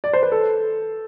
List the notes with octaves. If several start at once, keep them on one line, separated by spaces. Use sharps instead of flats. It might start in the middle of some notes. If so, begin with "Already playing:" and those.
D5
C5
B4
A4